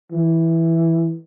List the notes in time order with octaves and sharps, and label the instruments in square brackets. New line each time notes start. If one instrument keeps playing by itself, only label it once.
[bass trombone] E3